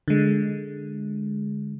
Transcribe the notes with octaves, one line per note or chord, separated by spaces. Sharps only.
D3 G#3